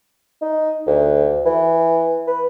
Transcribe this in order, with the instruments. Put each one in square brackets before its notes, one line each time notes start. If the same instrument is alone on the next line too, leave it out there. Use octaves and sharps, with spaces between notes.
[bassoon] D#4
D2
E3
B4